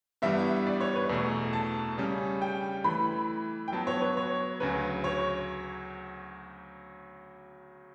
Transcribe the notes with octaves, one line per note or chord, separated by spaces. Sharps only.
G2 E3 G3 B3 E5
D5
C#5
B4
E2 B2 A3
A5
C#3 G3 C#4
G5
E3 A3 E4 B5
G5
F#3 B3 F#4 A5
C#5
B4
C#5
D2 C#3 F#3 B4
C#5